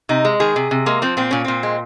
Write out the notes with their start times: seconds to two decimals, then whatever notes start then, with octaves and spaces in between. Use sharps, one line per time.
0.09 C3 D#4
0.25 G#3
0.40 D#3 G#4
0.56 C3
0.71 C3
0.86 G#3 A#3
1.02 F3 C4
1.17 A#2 C4
1.31 A#2 C#4
1.44 A#2 C4
1.63 G#3